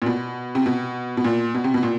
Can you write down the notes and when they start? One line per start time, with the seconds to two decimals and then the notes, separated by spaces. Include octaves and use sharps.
0.02 A#2
0.06 B2
0.55 C3
0.66 B2
1.17 B2
1.24 A#2
1.54 B2
1.64 C3
1.74 B2
1.83 A#2